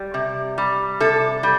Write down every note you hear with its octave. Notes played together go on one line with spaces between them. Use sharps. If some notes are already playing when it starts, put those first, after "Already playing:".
Already playing: G3
C3
G3
C3 A4
G3